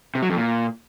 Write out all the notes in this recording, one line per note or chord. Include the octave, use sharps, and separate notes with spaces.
C3
F#3
F2
A#2